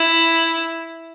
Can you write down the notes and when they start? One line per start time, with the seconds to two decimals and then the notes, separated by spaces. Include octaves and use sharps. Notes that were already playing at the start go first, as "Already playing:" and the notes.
Already playing: E4